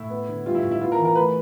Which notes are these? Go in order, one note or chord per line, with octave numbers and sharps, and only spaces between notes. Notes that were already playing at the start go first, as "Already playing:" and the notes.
Already playing: A2 E4
B3
D3
G3 F4
E4
A2
E4
B3 F4
A#4
E3
A#4
A3 B4